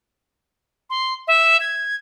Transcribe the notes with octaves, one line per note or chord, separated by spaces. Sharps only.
C6
E5
G#6